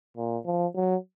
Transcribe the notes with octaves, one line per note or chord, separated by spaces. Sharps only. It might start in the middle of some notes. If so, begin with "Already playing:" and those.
A#2
F3
F#3